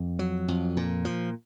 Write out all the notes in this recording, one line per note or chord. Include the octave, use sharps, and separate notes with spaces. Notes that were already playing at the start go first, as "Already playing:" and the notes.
Already playing: F2
F#3
F2
A#2
F3